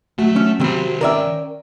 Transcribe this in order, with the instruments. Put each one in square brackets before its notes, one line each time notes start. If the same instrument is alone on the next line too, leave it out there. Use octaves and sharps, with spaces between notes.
[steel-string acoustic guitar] F#3 F#4 [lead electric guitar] A3
[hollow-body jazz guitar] C#4
[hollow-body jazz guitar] C3 C4 [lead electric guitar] D#3 B5
[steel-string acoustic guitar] C#4 G5 [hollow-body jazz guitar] A#4 D5 E5